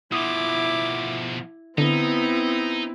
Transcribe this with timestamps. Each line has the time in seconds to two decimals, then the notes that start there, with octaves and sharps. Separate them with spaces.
0.12 B2 F3 E4 D6 D#6
1.78 D3 B3 C4 D#4 E4